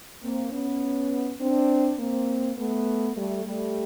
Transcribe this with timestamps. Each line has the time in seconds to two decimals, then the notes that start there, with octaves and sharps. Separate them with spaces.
0.23 A#3 C4
0.52 B3 C#4
1.40 C4 D4
1.99 A#3 C4
2.58 A3 B3
3.17 G3 A3
3.46 G3 A3